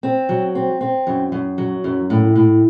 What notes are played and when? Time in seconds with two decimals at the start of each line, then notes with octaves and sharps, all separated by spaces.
0.03 C4
0.29 F#3
0.55 C4
0.81 C4
1.07 F#2
1.32 F#2
1.58 F#3
1.84 F#2
2.10 A2
2.36 A2